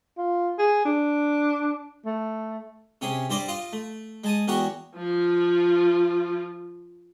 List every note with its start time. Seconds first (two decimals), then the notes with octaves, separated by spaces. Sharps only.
0.18 F4
0.59 G#4
0.85 D4
2.05 A3
3.01 C3 C#4 G4 G#4
3.30 G2 G4 C5 D5 D#5 D6
3.48 F4 D#5 F5
3.73 A3
4.24 G#3 A5 D#6
4.48 E2 G#3 F#4 G4 A#4 C#6
4.96 F3 F4